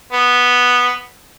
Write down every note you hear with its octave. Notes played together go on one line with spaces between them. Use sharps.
B3